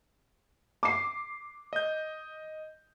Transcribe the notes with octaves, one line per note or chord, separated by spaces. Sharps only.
D6 C7
D#5 G6